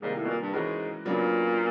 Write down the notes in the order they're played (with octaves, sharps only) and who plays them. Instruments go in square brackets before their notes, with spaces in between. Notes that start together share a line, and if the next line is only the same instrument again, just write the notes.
[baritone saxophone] G#2 [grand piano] C3 D#3 G3 A#3
[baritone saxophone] A2
B2
A#2
G2
[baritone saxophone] G#2 [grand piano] E3 G#3 C#4 F#4 A#4
[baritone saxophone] A#2 [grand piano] C#3 F#3 B3 D4